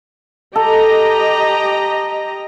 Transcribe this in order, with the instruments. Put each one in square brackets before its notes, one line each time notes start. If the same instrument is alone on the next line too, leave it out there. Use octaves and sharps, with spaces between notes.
[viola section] G4 D#5 A#5 [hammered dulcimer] A4